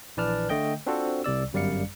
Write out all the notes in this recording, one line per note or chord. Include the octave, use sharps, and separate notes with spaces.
A#1 E3 B4 D5 A5 F6
D3 A3 D#5 G5 G6
C4 D4 F4 F#4 A4 C5
C2 C3 D5 E6
G1 F#2 G3 D5 F5 C#7